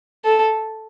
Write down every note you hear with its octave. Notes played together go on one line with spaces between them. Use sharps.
A4